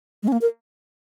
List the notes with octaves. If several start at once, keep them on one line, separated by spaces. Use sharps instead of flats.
G#3
C#4
A#3
A#4